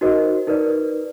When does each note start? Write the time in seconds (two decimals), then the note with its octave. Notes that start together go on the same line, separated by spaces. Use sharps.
0.01 D#4 F#4 A#4 C5 D#5
0.47 D#4 A#4 B4 D5